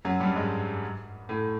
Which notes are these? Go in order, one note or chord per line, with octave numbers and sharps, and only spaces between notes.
F#2 F#3
G2 G3
G#2 G#3
A2 A3